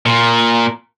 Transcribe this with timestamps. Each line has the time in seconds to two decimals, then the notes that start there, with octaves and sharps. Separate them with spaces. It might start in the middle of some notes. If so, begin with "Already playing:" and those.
0.06 A#2